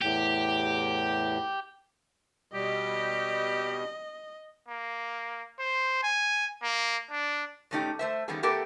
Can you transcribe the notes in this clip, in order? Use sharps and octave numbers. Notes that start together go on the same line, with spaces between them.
E2 A2 G4
B2 G3 G4 D#5
A#3
C5
G#5
A#3
D4
A#2 D#3 A3 C#4 D#4 G4
A3 C5 E5
D#3 G3 A3 B3 C#4 G#4
A3 B3 G4 A4 A#4